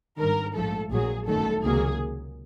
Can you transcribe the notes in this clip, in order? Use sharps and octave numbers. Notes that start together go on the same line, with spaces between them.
G#1 G2 D#3 A#4
A#1 G#2 F3 A3 A4
A#1 A#2 F#3 G#4
G1 F#2 D#3 F#3 A3 A4
C#2 C3 D#3 F#3 A#3 G#4